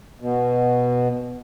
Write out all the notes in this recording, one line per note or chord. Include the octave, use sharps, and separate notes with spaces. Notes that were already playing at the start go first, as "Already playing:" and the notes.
B2